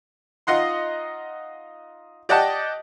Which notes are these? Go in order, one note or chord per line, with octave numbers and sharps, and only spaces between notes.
D#4 F4 D#5 F#5 C6
G4 D5 D#5 F#5 G5 A5